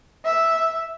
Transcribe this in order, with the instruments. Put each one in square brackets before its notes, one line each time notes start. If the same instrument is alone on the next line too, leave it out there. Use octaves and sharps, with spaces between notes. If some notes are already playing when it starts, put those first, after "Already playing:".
[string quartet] E5